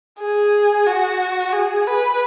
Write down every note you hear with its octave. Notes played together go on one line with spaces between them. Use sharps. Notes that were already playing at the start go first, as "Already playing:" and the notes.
G#4
F#4
G#4
B4